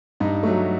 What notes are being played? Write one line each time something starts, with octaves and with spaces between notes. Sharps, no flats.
G2 D#4
F#3 A3